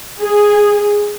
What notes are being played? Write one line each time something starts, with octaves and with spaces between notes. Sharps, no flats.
G#4